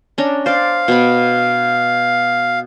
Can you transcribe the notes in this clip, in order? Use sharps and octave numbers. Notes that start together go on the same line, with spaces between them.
C#4 D4 A#5
C5 D5 F5
B2 B5